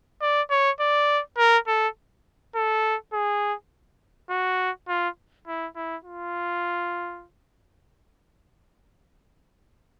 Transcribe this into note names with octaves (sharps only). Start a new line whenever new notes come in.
D5
C#5
D5
A#4
A4
A4
G#4
F#4
F4
E4
E4
F4